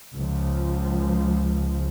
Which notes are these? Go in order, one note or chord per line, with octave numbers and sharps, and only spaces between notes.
C#2 F3